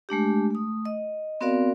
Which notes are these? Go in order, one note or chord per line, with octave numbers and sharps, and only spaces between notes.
G#3 A3 D4 G4
A3 D#6
D#5
B3 C4 F#4 A#4 D5 F5